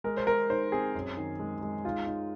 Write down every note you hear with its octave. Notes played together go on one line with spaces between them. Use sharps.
G#3 A#4
C5
G#3 A#4
D#4 C5
C4 G#4
F#2
D#3
G#3
G#3
D#4 F4
D#4